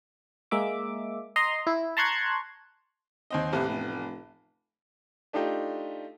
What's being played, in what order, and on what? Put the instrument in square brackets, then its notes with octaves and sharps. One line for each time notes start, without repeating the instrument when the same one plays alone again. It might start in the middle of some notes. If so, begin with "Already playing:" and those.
[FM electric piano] G#3 A#3 E5 D6
D#5 A#5 C6
E4
A5 A#5 C6 C#6 F#6 G#6
[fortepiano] D#2 C4 D#5
[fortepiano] A1 B3 [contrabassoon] C3
[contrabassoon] F1
[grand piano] A3 D4 D#4 F4 G4